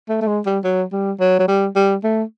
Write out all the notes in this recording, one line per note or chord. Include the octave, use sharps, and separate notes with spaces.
A3
A3
G#3
G3
F#3
G3
F#3
F#3
G3
G3
A3